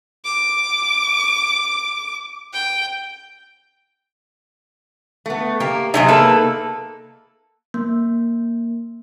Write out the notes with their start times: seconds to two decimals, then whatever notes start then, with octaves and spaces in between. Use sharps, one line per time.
0.25 D6
2.53 G5
5.26 A3 B3
5.60 A#3 G4
5.94 C3 E3 F#3 D#4 G#4 E5
6.08 A#3 A4 B4
7.74 A#3